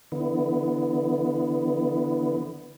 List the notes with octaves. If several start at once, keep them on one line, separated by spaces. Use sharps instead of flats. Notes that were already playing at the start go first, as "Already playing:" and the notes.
D3 E3 B3